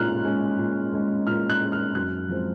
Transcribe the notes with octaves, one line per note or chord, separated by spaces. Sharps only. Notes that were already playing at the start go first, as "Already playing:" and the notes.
Already playing: A#2 G#3 C#4 F6 F#6
G#3 C#4
A#2
G#3 C#4
A#2 F6
F#6
G#3 C#4
F6
F#2 F#6
F3 G#3 C4